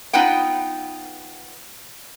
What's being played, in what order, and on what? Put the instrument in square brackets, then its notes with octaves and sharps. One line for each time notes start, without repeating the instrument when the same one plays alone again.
[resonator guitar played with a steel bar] B3 D#4 F4 B4 F#5 G5